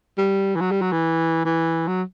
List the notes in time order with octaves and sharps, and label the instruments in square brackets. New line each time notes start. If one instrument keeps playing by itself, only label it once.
[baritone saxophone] G3
E3
F#3
G3
F#3
E3
E3
F#3